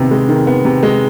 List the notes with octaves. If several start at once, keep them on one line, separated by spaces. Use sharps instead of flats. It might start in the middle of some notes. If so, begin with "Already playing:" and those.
Already playing: C3 D#3 B3
G#3
D#3
B3
C3
G#3